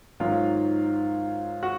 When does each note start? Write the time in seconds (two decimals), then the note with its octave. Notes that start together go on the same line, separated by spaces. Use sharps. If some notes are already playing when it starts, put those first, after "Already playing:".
0.20 G#2 D#3 F#3 F4
1.63 F#4